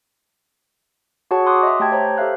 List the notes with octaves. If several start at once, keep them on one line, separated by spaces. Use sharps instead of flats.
F#4 G#4 C#5 F#5 A5 C#6
C6 D6 D#6 F#6
D#5 E5
A3 G4 G5 A5 G#6
C5 C#5 A#5
G4 A4 C5 E5 F5 F#6